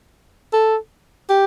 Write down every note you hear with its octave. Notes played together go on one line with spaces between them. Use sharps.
A4
G4